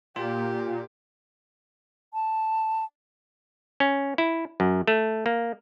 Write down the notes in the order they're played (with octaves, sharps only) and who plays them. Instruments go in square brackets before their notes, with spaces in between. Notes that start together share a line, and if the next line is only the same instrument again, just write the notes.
[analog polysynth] A#2 [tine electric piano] F4 [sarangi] G4
[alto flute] A5
[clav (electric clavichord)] C#4
E4
F#2
A3
A#3